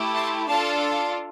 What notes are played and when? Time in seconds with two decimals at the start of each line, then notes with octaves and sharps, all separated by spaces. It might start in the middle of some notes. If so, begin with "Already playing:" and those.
Already playing: A3 E4 G4
0.15 A5 C6
0.48 D4 F4 A4 F5 A5